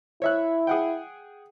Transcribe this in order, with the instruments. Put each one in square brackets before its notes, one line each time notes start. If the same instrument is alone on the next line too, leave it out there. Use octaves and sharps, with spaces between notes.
[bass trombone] E4 [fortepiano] C#5 E5 F#6
[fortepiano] G#4 F#5 G5